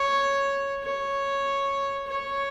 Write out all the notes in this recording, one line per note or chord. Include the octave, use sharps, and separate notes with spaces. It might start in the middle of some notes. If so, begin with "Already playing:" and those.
Already playing: C#5
C#5
C#5